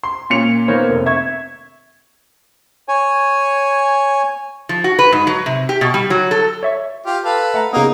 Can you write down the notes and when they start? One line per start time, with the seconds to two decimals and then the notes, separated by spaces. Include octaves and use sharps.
0.04 C6
0.30 A#2 C#4 C#7 F7
0.68 D#3 A#3 B3 A#4 C5 C#5
0.89 F1
1.06 E5 C#6 G#6
2.88 C#5 G#5
4.69 F3
4.84 F#4
4.99 B4
5.12 G#2
5.27 F#3
5.46 C3
5.69 G4
5.81 B2
5.94 G3
6.10 F#3
6.31 A4
6.63 C#5 E5 C#6
7.06 F4 G4
7.25 A4 B4 F5
7.54 A3 F#5 A#5
7.73 C#3 A#3 B3 D#4 D#6